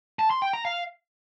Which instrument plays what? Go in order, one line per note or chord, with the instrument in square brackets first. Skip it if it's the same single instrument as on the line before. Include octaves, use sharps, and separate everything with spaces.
[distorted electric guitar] A5
C6
G5
A#5
F5